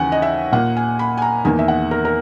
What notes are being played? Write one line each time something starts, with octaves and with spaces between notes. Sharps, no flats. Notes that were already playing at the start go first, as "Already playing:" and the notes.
Already playing: D#2 C#3 E3 F#5 G#5
D#5
E5
A#2 A#3 F#5
G#5
B5
G#5
A#5
E2 D#3 A#3 G#5
E5
F#5
A#4
A#4